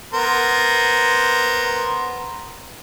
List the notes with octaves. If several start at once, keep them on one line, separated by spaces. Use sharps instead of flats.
B3 A#4 C5